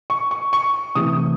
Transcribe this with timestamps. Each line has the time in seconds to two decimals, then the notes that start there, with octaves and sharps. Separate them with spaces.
0.10 C#6
0.31 C#6
0.53 C#6
0.95 C3 E3 A3 D#6